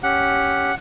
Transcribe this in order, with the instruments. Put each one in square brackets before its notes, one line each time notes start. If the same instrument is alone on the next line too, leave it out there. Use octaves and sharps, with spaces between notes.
[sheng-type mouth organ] C#4 G4 [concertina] F#5